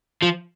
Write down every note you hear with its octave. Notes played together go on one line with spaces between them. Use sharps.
F3